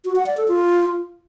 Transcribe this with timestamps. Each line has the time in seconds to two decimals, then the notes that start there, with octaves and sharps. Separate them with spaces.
0.05 F#4
0.16 F#5
0.26 D5
0.37 A4
0.48 F4